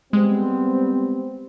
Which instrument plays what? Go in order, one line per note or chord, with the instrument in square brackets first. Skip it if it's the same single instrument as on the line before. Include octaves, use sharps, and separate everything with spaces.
[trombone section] G3 B3 C4 [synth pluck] G#3